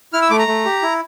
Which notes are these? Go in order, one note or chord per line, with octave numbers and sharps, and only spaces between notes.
E4 F6
E6
A3 D6
A#5
A3
G4
E4